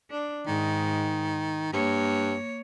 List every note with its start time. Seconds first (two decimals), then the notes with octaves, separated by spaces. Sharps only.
0.11 D4
0.46 G#2 D#3
1.73 G2 A#3 C#5